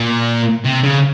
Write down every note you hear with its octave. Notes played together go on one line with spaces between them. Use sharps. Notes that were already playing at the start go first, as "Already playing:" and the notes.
Already playing: A#2
C3
C#3